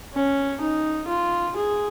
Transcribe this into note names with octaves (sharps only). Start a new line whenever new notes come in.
C#4
D#4
F4
G#4